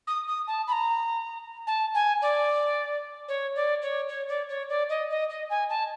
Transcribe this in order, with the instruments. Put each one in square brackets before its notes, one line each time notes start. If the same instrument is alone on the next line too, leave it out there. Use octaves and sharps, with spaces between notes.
[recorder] D#6
D#6
A5
B5
A#5
A5
G#5
D5
C#5
D5
C#5
C#5
D5
C#5
D5
D#5
D#5
D#5
G#5
A5